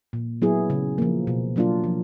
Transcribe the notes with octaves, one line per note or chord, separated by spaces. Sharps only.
A#2
F#3 B3 E4 G#4
C#3
F3 A#3
B2
F#3 A#3 D4 F4
F3